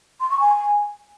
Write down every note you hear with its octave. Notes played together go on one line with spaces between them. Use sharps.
C6
C#6
G#5